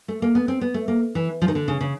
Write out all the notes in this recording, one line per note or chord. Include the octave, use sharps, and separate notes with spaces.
A3
A#3
B3
C4
B3
A3
A#3
E3
F3
D#3
D3
C#3
C#3